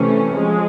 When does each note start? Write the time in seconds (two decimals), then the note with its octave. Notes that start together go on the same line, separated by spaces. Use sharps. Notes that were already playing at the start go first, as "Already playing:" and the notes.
Already playing: C3 E3 A3 C#4
0.36 F3 G#3